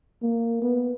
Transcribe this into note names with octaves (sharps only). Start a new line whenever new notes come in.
A#3
B3